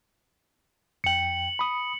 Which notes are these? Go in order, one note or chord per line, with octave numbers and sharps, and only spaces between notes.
F2 G5 C#7 F#7
B5 D#6